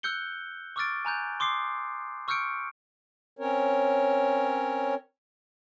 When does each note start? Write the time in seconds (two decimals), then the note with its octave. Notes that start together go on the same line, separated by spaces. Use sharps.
0.03 E6 F#6 G6 C#7 G7
0.76 C#6 D6 E6 F6 A6 D7
1.05 G#5 A#5 F#6 G6
1.40 C6 D6 D#6 C7
2.28 C#6 E6 F6 G6 C#7 D7
3.39 C4 C#4 A#4 C#5